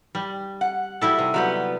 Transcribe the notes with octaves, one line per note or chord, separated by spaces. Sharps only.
G3
F#5
G3 E4 F#4 A4
C3
F#3 G3 B3